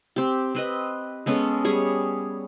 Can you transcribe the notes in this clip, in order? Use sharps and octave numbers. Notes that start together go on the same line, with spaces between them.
C4 G4
C4 B4 D#5
G#3 B3 C#4 A4
G3 G#4 C#5